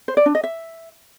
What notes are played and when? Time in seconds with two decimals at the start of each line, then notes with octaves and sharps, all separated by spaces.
0.08 C5
0.17 D5
0.26 D4
0.35 D#5
0.44 E5